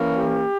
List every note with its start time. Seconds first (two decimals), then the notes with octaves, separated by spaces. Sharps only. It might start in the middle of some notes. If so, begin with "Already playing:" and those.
Already playing: E3 A#3 C#4
0.16 G4